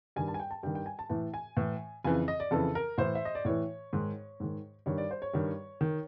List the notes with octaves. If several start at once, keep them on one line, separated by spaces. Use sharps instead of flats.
G2 D#3 G#5
A5
G#5
G5
A5
G2 D#3 G5
G5
G#5
A5
A2 E3 A5
G#5
A2 E3
F2 C#3 E3 G#5
D#5
D5
F2 C#3 E3 A4
A#4
A2 E3 C5
E5
D#5
D5
A2 E3 C#5
G#2 D#3
G#2 D#3
G2 D#3 C#5
D5
C5
C#5
G2 D#3
D#3